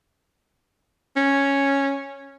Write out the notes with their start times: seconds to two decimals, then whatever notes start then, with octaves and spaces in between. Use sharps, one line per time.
1.16 C#4